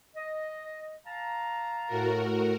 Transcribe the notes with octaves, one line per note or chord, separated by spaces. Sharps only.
D#5
F5 A5 A#5
A2 F#4 A#4